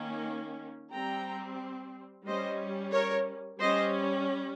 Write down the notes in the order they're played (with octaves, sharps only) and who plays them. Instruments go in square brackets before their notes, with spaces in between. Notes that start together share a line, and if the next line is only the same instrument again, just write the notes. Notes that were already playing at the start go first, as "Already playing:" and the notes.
Already playing: [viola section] D#3 A#3 C#4
G3 C4 G5 A#5
G3 C#4 C5 D#5
A#4 C#5
G3 C#4 C5 D#5